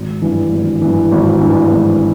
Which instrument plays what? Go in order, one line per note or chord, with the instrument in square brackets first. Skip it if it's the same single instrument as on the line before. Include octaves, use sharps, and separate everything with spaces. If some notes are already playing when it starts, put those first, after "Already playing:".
Already playing: [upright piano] G#1
G2 E3
G#1
G2 E3
G#1
G2 E3
G#1